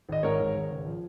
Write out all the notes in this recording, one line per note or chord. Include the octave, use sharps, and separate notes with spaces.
G#1 D#5
G#2 A#4 C#5
G#1
G#1
C#2
F3